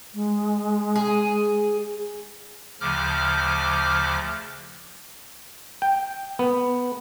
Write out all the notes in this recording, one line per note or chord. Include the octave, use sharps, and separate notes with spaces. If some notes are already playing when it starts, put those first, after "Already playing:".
G#3
G#4
D2 C#3 F3 D6 F6 G6
G5
B3